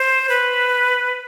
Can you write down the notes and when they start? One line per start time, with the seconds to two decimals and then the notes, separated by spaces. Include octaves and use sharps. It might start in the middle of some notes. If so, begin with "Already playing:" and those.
Already playing: C5
0.29 B4